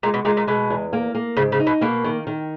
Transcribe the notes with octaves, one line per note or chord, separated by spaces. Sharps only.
A#2 G#3
B2
A#2 G#3
A#2
B2 G#3
E2
A#3
A#3
G#2 C#3
C#3
D#4
B2
B2 A#3
D#3
D#3